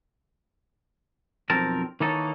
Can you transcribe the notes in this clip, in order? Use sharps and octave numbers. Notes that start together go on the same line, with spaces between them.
B1 F2 C4 A#4 A5
D#3 E3 A#3 D#4 A4 C#5